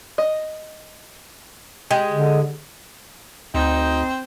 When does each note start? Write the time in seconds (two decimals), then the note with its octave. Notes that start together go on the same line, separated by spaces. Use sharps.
0.18 D#5
1.91 G#3 G4
2.12 D3
3.54 D2 C4 D#4